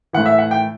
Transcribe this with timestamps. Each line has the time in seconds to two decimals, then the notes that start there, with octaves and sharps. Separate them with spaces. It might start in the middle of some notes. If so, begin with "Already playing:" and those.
0.13 A2 E3 F#5
0.26 E5
0.38 F#5
0.51 G5